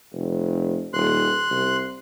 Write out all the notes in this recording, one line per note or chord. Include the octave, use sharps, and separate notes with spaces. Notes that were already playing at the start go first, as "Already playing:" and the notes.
F1
D#1 C6 F#6
C2